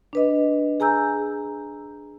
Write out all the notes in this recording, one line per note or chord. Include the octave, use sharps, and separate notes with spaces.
D4 B4 D#5
G#4 G#5 A#5 E6 G6